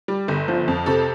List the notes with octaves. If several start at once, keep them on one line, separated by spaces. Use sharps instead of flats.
G3
G1
F3
F2
C3 A4